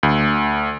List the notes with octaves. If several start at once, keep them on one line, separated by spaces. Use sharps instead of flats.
D2